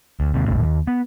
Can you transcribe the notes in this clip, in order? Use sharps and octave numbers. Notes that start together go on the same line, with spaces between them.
D2
D#2 C3
A#1 F2 A2 C#3
D#2
B3